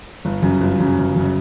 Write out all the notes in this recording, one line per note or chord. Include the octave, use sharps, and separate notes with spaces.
G1
F#2 C#3
G1
F#2 C#3
G1
F#2 C#3